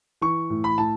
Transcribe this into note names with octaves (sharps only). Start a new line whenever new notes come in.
E3 C#6
A2
B5
A2 A5